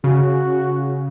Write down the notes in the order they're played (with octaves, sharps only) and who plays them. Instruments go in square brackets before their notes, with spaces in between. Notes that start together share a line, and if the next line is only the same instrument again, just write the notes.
[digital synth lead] C#3 [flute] F#4